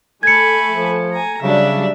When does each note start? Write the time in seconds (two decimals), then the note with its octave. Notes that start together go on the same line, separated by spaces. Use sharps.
0.23 A3 A4 G#5 B5 G#6 C#7
0.70 F3
1.13 G#5 A#5
1.42 C#3 F#3 G3 D4 E5